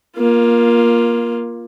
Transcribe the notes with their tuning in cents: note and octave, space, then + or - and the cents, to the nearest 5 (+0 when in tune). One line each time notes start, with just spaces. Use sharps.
A#3 +20 F4 +0